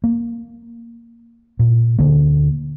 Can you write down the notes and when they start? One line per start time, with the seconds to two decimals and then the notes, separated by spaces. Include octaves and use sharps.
0.04 A#3
1.59 A#2
1.99 D2 D3 A#3